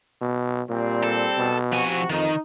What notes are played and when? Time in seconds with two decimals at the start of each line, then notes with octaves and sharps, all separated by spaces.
0.21 B2
0.70 A#2 G3 C4
1.03 A4
1.38 B2
1.72 C3 F3 F#4 G#5
2.10 F2 D#3 D#4